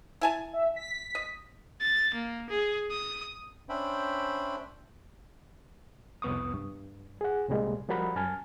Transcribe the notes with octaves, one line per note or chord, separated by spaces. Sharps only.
E4 G#5 A5
E5
B6
D#5
A6
A#3
G#4
D#6
C#4 D4 C5 E5 G5 B5
C2 F2 B3 C#6 D#6
G2
G#4 F#5
C2 A2 C3 G3 G#3 A#3
F3 G3 F#4 A#4 F#5 B5
F#2 G#5 A5 F6